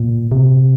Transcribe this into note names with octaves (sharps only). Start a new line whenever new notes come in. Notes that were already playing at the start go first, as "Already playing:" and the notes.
Already playing: A#2
C3